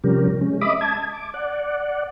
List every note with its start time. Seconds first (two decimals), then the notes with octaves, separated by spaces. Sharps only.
0.04 C3 F3 G3 C#4 G4 A#4
0.41 G#3 C#4
0.61 D#5 E5 B5 D6 D#6
0.81 A5 G#6
1.12 D6
1.34 D5 F#5